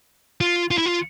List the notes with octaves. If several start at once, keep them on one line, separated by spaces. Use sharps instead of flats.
F4
F4
E4
F4